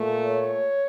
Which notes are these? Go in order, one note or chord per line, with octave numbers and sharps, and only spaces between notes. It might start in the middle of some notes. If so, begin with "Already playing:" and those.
Already playing: A#2 A3
C#5